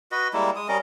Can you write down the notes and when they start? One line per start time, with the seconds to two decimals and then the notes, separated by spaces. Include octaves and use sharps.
0.12 F#4 B4 D#5
0.33 G3 G#3 A#3 E4
0.56 G#3 D#6
0.69 G3 C#4 A#4 D#5